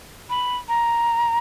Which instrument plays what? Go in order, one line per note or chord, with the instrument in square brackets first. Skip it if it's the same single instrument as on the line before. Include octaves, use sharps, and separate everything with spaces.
[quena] B5
A#5